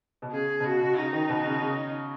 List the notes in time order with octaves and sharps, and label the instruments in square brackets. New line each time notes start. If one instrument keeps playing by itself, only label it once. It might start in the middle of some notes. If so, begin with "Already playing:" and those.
[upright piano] B2
[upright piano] C#3 [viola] G#4
[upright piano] B2
[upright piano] C#3 [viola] F#4
[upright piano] B2
[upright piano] C#3 [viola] D#4
[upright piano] D#3
B2
C#3
C#3